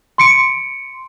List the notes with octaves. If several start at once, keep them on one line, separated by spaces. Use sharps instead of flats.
C6 C#7 D7